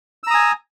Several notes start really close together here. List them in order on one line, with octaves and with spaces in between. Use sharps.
E6 A#5 D#6 G#5